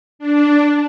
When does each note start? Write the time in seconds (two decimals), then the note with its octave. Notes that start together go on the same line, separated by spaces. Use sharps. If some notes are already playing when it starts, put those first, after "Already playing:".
0.19 D4